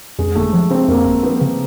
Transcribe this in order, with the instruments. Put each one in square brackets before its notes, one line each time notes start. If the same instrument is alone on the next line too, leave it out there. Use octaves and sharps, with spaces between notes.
[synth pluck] F2 [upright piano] G#3
[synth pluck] G1 [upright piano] A3
[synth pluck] F3
[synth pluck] C#3 [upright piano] C4
[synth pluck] F2 [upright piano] A#3
[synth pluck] G1
[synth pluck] F3 [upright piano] B3
[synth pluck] C#3